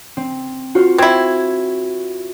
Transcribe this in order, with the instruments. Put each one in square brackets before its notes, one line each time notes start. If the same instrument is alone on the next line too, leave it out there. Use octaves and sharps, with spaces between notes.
[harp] C4
F4 F#4 C5
[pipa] C4 E4 [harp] C#6 G#6